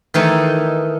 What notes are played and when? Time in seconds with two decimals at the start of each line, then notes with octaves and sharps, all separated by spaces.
0.14 D#3 E3 A3 D#4